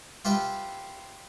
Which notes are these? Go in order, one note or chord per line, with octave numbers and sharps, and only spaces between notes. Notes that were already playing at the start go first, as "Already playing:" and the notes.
F4 G4 B4 E5 F5 G5